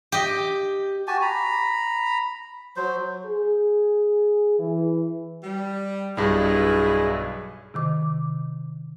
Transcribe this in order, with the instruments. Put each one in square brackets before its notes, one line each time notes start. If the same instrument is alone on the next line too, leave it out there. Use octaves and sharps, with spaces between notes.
[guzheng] G4 D#5
[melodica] F#4 G4 G#5 A5
A#5 B5
F#3 C5
[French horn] G#4
E3
[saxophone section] G3
[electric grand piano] B1 G2 [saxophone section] E4 G#4
[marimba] C3 D#3 D6